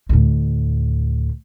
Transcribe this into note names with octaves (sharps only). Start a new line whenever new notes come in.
D2 A2